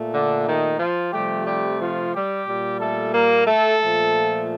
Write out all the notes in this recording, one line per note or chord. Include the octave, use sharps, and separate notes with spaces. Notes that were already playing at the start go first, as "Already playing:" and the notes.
Already playing: A#2 A3
D3 D4
D#3 D#4
F3 F4
C3 F3 G3 A3 G4
G3 G4
F3 F4
G3 G4
A#2 G3
A3 A4
A#3 A#4
A3 A4
A#2 F3 A3